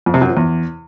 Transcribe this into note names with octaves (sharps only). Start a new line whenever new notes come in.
F2
C3
F#2
F3
E2